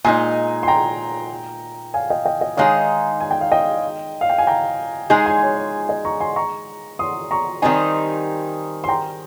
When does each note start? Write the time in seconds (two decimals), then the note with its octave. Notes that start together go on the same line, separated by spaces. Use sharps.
0.04 A#2 G#3 D#4 G#5 C6
0.63 C6
0.68 G5 A#5
1.94 F5 G#5
2.10 D#5 G5
2.25 D#5 G5
2.41 D#5
2.57 D#3 G#3 D#4 G#4 C#5 F5
3.20 G#5
3.31 G5
3.41 F5
3.52 D#5 G5
4.21 F5
4.30 G5
4.38 G#5
4.47 G5 A#5
5.10 G#3 D#4 G#4 G#5 C6
5.26 G#5 C6
5.42 C#5
5.57 C#5
5.89 D#5
6.05 A#5 C#6
6.20 G#5 C6
6.36 A#5 C#6
6.99 C6 D#6
7.31 A#5 C#6
7.62 D#3 G3 C4 D#4 G#5 C6
8.84 C6
8.89 G5 A#5